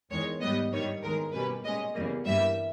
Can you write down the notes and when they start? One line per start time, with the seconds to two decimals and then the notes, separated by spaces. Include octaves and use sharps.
0.11 E2 D#3 G#3 C#5
0.41 G#2 G3 B3 D#5
0.72 G2 D#3 G3 C#5
1.03 E2 D#3 G#3 A#4
1.33 B2 G3 A#3 C#4 B4
1.64 A#2 G#3 C#4 D#5
1.95 E2 C#3 E3 G3 A#3 D#5
2.26 G2 E3 G3 A#3 E5